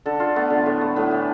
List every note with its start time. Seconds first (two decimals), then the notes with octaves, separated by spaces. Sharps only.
0.06 D3 A4
0.20 D3 F4
0.36 A3 B3
0.50 D3
0.66 A2
0.81 A3
0.96 A2 B3
1.11 E3